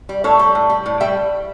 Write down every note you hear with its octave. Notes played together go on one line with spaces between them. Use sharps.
G3
A2 A4 C#5
G3
A2
G3
A2
G3 E5 G5